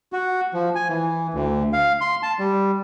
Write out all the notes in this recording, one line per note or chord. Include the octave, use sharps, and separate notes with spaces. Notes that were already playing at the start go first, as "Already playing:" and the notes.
F#4
F3
G#5
E3
D2
F5
C6
A5
G3